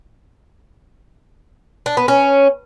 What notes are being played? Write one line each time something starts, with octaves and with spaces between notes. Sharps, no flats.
D4
B3
C#4